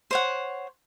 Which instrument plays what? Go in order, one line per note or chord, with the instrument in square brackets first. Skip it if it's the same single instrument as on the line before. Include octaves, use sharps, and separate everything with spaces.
[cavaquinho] C5 C#5 F#5